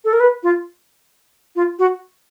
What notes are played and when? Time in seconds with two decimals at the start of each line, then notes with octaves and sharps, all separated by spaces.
0.05 A4
0.13 A#4
0.20 B4
0.43 F4
1.56 F4
1.79 F#4